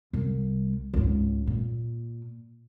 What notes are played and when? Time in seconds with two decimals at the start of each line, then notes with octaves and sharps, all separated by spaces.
0.13 C2 G3
0.94 C#2 G#2
1.47 A#2